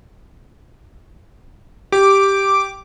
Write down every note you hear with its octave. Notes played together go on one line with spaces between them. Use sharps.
G4 D6